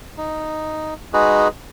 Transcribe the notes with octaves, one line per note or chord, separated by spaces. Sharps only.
D#4
G#3 D#4 F#4 G#4 B4